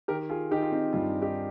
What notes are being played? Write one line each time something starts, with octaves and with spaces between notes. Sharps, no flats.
D#3 G4 A#4
F4 G#4
D#3 D#4 G4
F4
C4 D#4
G2 D4 F4
D#4 G4